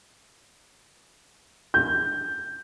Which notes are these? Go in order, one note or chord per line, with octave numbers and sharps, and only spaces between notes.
G6